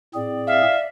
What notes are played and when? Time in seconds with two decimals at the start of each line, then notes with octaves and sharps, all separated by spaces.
0.14 A2 C4 G#4 D5
0.47 E5 F5